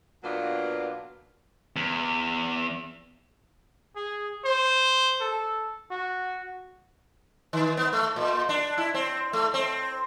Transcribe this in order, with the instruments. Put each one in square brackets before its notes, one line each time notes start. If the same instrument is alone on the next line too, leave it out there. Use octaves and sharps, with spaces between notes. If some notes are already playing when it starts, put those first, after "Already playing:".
[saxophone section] B2 F#3 A#3 B3 D4 F4
[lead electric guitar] E2
[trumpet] G#4
C5
A4
F#4
[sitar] D#3
B3
A3
A#2
D4
E4
C4
A3
C4